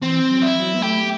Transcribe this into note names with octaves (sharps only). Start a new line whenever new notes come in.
E3 C4
F#3
E4
F#3
B3
A3 G4